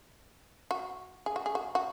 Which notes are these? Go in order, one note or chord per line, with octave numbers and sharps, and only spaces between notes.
F#4
G#4
F#4
G#4
F#4
F#4